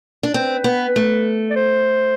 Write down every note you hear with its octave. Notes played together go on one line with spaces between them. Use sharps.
D4
C4 B4
B3
A3
D5
C5